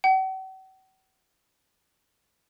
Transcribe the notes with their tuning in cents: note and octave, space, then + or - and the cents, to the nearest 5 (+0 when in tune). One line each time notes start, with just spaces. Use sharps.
F#5 +45